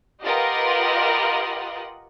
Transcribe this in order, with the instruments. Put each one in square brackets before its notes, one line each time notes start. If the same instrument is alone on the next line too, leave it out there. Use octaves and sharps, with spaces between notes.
[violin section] F4 G4 A#4 B4 D#5 F#5